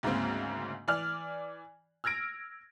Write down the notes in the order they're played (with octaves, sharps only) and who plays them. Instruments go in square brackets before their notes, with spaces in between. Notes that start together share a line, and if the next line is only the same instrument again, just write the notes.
[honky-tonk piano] D2 G#2 C#3 A#3 C4
E3 D5 F6
E6 F6 G#6 A#6 D7